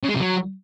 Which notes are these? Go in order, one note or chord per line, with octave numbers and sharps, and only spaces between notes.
C#3
G#3
C3
F#3